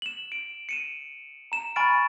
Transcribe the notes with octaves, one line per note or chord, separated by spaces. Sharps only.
E7 F#7
D7
C#7 D#7 E7
A#5 E7
G#5 B5 C#6 F6 A6 D7